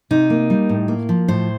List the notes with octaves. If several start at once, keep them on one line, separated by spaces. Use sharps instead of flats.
C3 D#4
A#3
G3
A2
A#3
F3
A2 C5